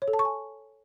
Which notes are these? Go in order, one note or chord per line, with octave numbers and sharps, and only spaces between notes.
C#5
A4
A5
C#6
G#5